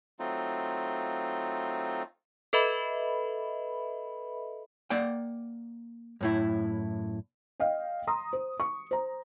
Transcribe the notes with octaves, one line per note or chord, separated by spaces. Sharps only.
F#3 A3 C4 D#4 F4
A4 B4 D#5 E5 B5
A#3 D5 F#5 G5
F#2 A2 E4
D#5 F5 G5
A#5 C6 D#6
C5
C#6
C5 A#5